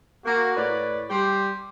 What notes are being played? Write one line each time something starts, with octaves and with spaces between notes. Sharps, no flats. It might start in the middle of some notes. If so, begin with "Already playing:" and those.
A#3 F#4
A2 B4 C#5 D5
G3 G4 C6